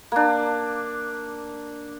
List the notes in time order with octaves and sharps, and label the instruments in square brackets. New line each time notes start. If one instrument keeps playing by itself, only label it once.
[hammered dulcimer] A#3 D4